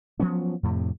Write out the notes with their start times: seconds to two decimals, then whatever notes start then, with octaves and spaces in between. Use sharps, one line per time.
0.20 F3 F#3 B3 C#4
0.63 F2 A2 C3